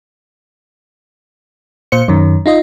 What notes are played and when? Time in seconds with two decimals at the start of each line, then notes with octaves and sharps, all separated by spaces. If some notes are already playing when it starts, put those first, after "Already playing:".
1.92 A#2 C5 C#7
2.08 F#2 D#3
2.46 D#4 F4 D#5